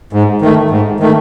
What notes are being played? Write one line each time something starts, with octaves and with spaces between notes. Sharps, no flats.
G#2
D#3 A3
G#2
D#3 A3